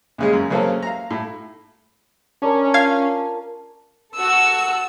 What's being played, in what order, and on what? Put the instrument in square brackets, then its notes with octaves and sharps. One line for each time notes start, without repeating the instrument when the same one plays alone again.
[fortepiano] C#2 C#3 G#3
F#2
C#3 F#3 A#3 C4 C#4 A4
F5 A#5
A2
[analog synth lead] C#4 [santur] D4 A#4
[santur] F4 [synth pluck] F5 G#6
[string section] F#4 A4 [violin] E6